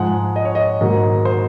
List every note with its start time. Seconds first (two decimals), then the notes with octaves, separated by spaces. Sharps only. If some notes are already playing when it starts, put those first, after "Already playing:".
Already playing: G#2 F3 G#3 F#5
0.36 D#5
0.45 C#5
0.55 D#5
0.81 G#2 D#3 F#3 A#3
1.25 C5